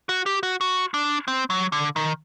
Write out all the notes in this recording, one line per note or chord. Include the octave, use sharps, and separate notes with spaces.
F#4
G4
F#4
F#4
D4
C4
F#3
D3
D#3